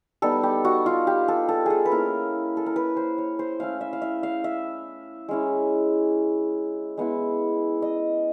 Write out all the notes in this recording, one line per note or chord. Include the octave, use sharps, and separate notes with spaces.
G3 B3 D#4 A4
G4
F#4
F4
G4
A4
A4
G#4 A4
B4
A#3 C#4 E4 A#4
A4
A#4
B4
C5
C#5
C5
A3 C#4 E4 F5
E5
F5
E5
F5
E5
G#3 C#4 E4
G#3 B3 E4
D#5